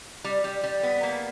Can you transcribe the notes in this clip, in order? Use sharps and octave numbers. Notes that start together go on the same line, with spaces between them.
G3
G3
G3
B3
A#3